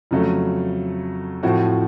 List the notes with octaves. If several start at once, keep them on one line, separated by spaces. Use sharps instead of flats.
F2 C#3 F#3 A3
A2 F3 A3 C4 F#4